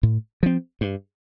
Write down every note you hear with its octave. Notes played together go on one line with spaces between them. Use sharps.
A2
F3 C4
G2